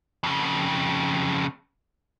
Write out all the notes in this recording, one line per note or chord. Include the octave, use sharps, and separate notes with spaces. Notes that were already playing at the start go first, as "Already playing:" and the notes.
F2 C#3